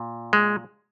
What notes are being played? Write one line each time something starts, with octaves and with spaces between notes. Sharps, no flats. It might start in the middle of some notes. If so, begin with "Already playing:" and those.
Already playing: A#2
G#3